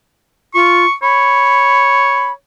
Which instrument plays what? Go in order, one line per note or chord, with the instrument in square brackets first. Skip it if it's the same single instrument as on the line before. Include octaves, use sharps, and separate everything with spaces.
[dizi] F4 [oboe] C#6
[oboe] C#5 [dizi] B5